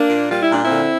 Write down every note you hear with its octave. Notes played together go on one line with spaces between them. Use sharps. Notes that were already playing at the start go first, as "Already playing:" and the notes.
Already playing: A#3 D4
A#2
G3 F4
E4
A#2 D4
C4 E4
D3